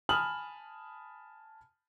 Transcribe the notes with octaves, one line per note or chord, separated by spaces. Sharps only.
G#5 A5 B5 D#6 F6 F#7